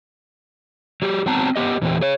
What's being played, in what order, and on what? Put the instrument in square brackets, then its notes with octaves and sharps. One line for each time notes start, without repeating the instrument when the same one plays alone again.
[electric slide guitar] F#3 G4
F#3 B3 C4 A5 A#5
B3 G4 D#5
E2 A#2 E3 C4 G4
G#4 C#5